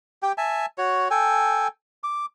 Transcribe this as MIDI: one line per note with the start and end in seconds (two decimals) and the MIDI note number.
0.23 0.32 67
0.23 0.32 79
0.38 0.66 76
0.38 0.66 80
0.38 0.66 81
0.78 1.08 66
0.78 1.08 73
1.11 1.68 69
1.11 1.68 79
1.11 1.68 80
2.03 2.26 86